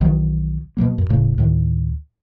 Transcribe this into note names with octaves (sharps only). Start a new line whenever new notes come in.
B1 D#3 E3 F#3
B2 D#3 F#3 A#3
F#2
D#1 A2 C#3 A3
D2 A2 D#3